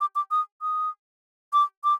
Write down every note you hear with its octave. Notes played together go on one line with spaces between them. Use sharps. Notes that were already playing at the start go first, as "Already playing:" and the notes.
D6
D6
D#6
D#6
D6
D6